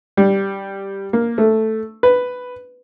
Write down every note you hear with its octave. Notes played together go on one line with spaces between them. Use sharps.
G3
A#3
A3
B4